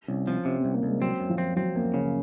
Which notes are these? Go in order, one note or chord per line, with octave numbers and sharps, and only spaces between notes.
C2 C#4
F3 C4
C3 C#4
C4
C2
A#3
C2 G#3
F#3 C4
F#2
F3
C4
F#3 C4
F#2 A#3
C#3 C#4